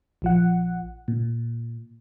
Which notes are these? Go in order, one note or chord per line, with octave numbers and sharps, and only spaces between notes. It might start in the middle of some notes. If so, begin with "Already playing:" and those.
A#1 F3 F#5
A#2